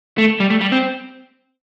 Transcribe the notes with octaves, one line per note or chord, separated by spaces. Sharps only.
A3
G3
A3
G3
C4